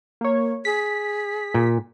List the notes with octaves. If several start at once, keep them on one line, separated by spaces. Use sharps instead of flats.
A#3 C#5
G#4 B6
A#2